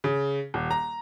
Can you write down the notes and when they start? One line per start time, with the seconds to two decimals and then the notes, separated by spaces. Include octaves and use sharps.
0.04 C#3
0.54 D#1
0.71 A#5